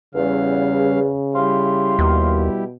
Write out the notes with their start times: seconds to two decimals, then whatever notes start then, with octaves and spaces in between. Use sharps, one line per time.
0.15 E2 C#3 G3 C#4 F5
1.34 G3 E4 G4 F5 C6
1.99 D#2 B2